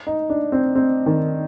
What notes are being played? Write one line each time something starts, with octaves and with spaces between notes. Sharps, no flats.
D#4
D4
C4
C4
D#3